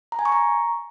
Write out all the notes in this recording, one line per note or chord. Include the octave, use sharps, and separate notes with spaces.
A#5
G#5
C#6
A#5